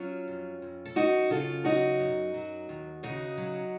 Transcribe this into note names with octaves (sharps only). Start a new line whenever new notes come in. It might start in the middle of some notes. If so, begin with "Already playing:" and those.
Already playing: F#3 C#4 F4
F2
F2
A4
F#2 D#4 F#4
C#3 F4 A4
F#3 D#4 F#4
F#2
F#3
D#2
C#3 D#4 F#4
F#3